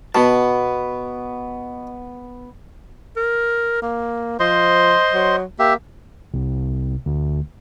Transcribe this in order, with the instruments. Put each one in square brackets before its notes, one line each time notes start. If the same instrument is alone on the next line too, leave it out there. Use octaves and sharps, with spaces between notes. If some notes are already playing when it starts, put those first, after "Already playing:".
[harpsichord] B2 [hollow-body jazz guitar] B3 A5
[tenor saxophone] A#4
A#3
[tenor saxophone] F3 [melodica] C5 D#5 C6
[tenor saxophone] F#3
[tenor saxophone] A#3 [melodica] G4 E5
[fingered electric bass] C2
D2